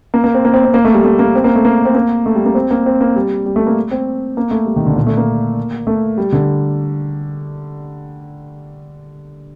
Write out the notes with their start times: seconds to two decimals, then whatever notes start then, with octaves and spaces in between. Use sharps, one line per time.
0.14 A#3
0.24 A#3
0.34 C4
0.45 A#3
0.54 C4
0.64 C4
0.74 A#3
0.85 A3
0.94 G3
1.04 A3
1.19 A#3
1.35 C4
1.44 A#3
1.55 A3
1.65 A#3
1.85 C4
1.95 A#3
2.26 A3
2.36 G3
2.46 A#3
2.55 C4
2.71 A#3
2.86 C4
3.01 A#3
3.16 G3
3.46 G3
3.56 A3
3.67 A#3
3.91 C4
4.37 A#3
4.51 A3
4.66 G3
4.76 D#3
4.86 D3
4.96 A#2
5.07 A3
5.17 A#3
5.87 A3
6.18 G3
6.32 D3